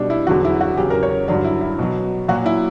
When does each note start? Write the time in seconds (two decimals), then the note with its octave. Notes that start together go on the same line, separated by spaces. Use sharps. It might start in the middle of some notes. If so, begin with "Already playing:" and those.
Already playing: B2 G3 D4
0.10 E4
0.27 E2 D3 F#3 F#4
0.45 E4
0.61 F#4
0.77 E2 C#3 F#3 G4
0.90 A#4
1.03 C#5
1.28 G2 D3 F#3 D5
1.44 E4
1.61 E4
1.79 B2 F#3
2.28 A#2 F#3 F#4
2.46 E4